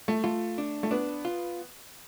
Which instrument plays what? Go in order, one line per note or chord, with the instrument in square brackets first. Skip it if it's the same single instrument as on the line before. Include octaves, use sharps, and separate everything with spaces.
[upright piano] A3
[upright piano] A3 [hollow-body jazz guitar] F4
[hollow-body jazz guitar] D4
[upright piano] A3
[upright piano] B3 [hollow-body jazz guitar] D4
[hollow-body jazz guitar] F4